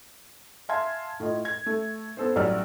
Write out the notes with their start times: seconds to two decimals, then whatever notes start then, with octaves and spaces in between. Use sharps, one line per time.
0.69 E5 F5 G#5 A5 C6 G#6
1.20 A2 F4 D#5
1.45 G#6
1.66 A3
2.17 B3 A4 C5
2.35 A1 F#3 G3 D5 E6 F6